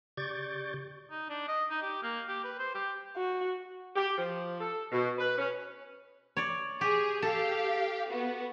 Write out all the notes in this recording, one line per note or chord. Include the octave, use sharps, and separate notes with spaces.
C#3 G4 D5 C#6 G6 A6
D#4
D4
D#5
D#4
G4
A#3
G4
B4
C5
G4
F#4
G4
F3
A4
B2
B4
C#4
C#5 D5
G4 G#4
G4 A4 F5
B3 F#4